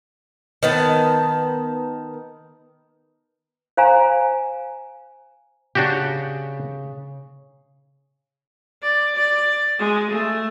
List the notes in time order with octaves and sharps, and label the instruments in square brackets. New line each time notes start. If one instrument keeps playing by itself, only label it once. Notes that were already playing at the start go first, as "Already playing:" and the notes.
[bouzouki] D#3 B3 A5
[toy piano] C5 F5 G#5 A#5
[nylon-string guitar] C#3 [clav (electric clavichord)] D4 F#4 G4
[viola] D5
D5
G#3
A3